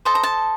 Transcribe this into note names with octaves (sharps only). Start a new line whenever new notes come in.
A4 C5 D#5 A5
A#5
A5